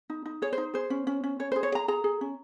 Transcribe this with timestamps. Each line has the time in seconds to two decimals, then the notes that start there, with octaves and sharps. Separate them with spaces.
0.10 D#4
0.26 D#4
0.42 G#4 C#5
0.53 C5
0.58 D#4
0.74 G#4 C5
0.90 C#4
1.07 C#4
1.24 C#4
1.39 C#4 C#5
1.52 G#4 C5
1.63 C#5
1.72 G#4 A#5
1.88 G#4 A#5
2.04 G#4
2.21 C#4